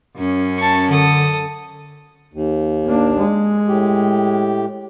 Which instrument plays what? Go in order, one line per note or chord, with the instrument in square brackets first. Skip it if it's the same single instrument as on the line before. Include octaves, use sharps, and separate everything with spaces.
[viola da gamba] F#2 C#4
[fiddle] A5 C#6
[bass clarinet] D3 [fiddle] A4 D#6
[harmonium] D#2
[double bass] A#3 D4
G#3
[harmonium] A2 G4